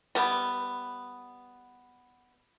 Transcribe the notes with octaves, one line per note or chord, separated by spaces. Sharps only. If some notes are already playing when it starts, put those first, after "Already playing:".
G3 B3